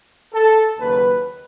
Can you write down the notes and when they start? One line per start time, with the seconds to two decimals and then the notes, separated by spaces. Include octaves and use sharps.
0.33 A4
0.79 D#2 C#3 F#3 B4